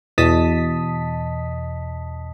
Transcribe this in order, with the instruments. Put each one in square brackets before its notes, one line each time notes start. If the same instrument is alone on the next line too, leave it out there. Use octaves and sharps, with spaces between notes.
[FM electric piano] E2 B2 D#5 A5 D#6 B6